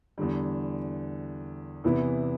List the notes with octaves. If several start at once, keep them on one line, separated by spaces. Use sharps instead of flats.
E2 D3 G3
E2 C3 E3 B3 E4